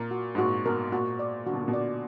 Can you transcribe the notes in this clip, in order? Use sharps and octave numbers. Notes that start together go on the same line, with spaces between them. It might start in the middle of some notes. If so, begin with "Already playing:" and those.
Already playing: A#2 A#4
F#4
G#2
A#2 F#4
B2 A#4
A#2 F#4
D5
D3 F#4
B2
A#2
B2
D5